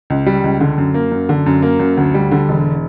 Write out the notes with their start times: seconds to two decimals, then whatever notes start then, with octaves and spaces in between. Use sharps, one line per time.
0.10 C#2
0.26 G3
0.44 C#2
0.60 D3
0.78 F#2
0.94 A#3
1.12 F#2
1.29 D3
1.46 F#2
1.62 A#3
1.79 F#2
1.97 D2
2.14 G3
2.31 D3
2.49 E1